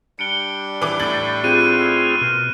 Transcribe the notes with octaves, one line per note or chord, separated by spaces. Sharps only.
G3 D4 C#7 D7 G7
E3 D6
A2 A6 F#7
C4 F4 G#4 F#6 D#7
B2 A#4